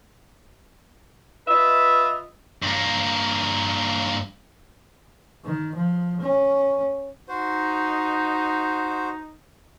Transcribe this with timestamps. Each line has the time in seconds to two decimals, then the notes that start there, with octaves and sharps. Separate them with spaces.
1.47 F4 B4 D#5 E5
2.62 G2 A#3
5.44 D#3
5.74 F3
6.21 C#4
7.29 D#4 F#4 C5